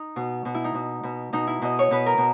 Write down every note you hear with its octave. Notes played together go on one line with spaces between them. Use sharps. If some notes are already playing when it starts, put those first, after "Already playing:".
Already playing: D#4
B2
B2
E4
D#4
B2
B2
B2 D#4
E4
B2 D#5
C#5
B2 B4
A#4
B2